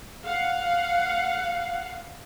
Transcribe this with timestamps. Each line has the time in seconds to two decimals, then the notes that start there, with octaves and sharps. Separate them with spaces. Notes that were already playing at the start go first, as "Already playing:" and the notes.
0.25 F5 F#5